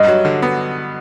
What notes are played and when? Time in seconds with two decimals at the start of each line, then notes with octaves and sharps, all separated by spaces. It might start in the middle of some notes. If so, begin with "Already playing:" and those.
Already playing: G2 D#5
0.08 F#3
0.25 D3
0.42 B3